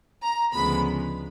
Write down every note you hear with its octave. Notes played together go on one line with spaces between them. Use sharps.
A#5
D2 C#3 F3 G#3 B3 B5